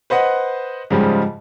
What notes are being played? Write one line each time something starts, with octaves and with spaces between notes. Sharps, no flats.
B4 C5 D#5 F#5
G#2 C#3 F3 G3 G#3